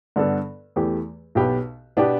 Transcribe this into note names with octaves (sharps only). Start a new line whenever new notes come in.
G2 D3 B3 D4 A4
E2 E3 A3 G4
B1 B2 B3 G4 B4
B2 B3 D4 G4